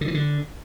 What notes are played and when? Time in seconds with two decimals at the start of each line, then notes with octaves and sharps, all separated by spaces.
0.01 D3
0.08 E3
0.14 D3